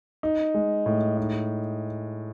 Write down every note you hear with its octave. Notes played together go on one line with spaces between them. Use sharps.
D#4
G#3
A2
D#4